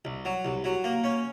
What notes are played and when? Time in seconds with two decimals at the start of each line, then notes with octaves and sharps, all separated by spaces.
0.05 C2
0.25 F#3
0.45 C2
0.64 F#3
0.84 A#3
1.04 C#4